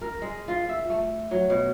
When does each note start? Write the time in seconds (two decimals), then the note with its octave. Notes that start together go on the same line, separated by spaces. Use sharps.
0.01 A#4
0.22 G#3
0.48 F4
0.69 E5
0.90 A3
1.31 F#3
1.50 B2